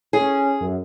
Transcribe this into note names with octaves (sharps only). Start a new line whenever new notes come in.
C#4 G#4
F#2